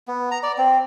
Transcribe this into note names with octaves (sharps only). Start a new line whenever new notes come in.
B3
A#5
D5
C4